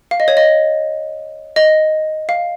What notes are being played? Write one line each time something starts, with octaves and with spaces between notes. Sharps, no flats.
F5
D#5
C#5
D#5
D#5
F5